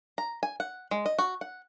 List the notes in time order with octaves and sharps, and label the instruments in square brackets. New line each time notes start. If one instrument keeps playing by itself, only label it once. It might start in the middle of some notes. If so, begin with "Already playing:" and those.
[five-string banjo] A#5
G#5
F#5
G#3
D#5
F#4
F#5